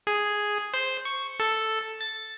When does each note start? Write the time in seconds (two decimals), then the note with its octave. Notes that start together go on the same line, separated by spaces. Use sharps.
0.07 G#4
0.74 C5
1.05 C#6
1.40 A4
2.01 A6